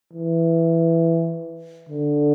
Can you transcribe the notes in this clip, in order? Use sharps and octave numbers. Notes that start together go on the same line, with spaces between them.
E3
D3